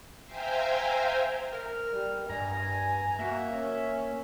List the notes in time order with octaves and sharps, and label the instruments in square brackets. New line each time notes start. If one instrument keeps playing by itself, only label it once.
[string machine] C5 E5 F5 G5 G#5 A#5
[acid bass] A#4 [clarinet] F6
[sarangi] G3
[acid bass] G2 [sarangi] G#5 [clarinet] A#5
[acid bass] A#3 [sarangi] F#4 [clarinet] E5
[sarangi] C#4